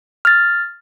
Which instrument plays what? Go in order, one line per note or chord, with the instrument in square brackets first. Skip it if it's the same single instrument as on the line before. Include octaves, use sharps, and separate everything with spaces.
[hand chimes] F6 A6